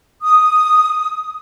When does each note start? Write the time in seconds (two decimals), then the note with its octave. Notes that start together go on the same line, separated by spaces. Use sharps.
0.22 D#6